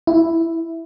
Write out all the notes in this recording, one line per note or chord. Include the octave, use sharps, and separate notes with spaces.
E4